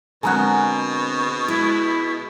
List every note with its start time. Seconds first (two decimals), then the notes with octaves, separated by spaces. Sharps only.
0.23 B2 D3 G#3 C4 G#4 A#4 F#5
1.48 G#3 E4